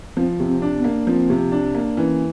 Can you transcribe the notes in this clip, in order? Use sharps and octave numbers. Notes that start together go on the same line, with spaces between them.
F3 C4
C3
C4
D4
B3
A#3
F3 C4
C3
D4
A#3
E3 C#4